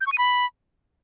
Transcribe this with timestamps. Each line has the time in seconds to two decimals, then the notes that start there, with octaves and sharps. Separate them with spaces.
0.01 G6
0.07 C#6
0.12 D#7
0.18 B5